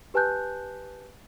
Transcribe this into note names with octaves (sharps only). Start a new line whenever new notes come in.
G4 B4 G#5 A5 F#6 G6